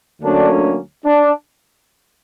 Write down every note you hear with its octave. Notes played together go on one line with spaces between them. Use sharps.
D2 D3 F#3 A#3 C#4 D4
D4